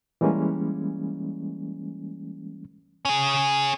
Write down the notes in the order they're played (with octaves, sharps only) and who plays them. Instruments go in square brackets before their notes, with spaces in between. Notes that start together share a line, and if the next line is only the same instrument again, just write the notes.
[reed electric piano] E3 G3 G#3 A#3 C#4
[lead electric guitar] C#4 G#4